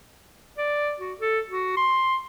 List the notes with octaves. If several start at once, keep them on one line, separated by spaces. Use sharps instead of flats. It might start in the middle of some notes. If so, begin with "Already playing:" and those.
D5
F#4
A4
F#4
C6